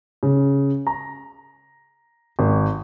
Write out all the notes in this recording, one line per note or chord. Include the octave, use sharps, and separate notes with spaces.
C#3
A#5
G#1